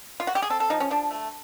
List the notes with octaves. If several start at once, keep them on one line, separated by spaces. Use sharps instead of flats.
F4
F#4
G4
G#4
C4 A4
A4
F3 D#4
C#4
F3 D4
A3